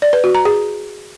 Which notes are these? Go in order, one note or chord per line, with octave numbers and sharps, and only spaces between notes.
D5
B4
F#4
A#5
G#4